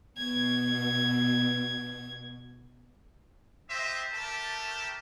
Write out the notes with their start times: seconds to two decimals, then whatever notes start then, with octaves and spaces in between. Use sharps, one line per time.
0.18 B2 G#6
3.68 F4 G4 C5 D#5 E5
4.12 A3 G4 A#4 A5